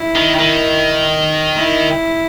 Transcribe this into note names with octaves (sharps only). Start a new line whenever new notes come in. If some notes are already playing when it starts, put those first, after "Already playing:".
Already playing: E4
D#3
D#3
E4